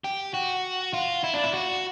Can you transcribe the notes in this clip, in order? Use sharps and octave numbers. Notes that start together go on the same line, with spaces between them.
G4
F#4
F4
E4
D4
E4
F#4